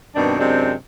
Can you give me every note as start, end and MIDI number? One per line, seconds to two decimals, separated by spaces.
0.16 0.37 43
0.16 0.37 47
0.16 0.37 51
0.16 0.37 60
0.16 0.37 62
0.39 0.74 42
0.39 0.74 48
0.39 0.74 56
0.39 0.74 60
0.39 0.74 62